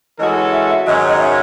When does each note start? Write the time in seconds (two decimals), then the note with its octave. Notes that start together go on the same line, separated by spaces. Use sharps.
0.19 E3 G#3 C#4 F#4 A4 D#5
0.52 E5
0.69 E5
0.86 G#2 D#3 F#3 C#4 D#5
1.08 D#5
1.19 E5